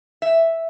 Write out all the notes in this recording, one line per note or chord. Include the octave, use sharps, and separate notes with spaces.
E5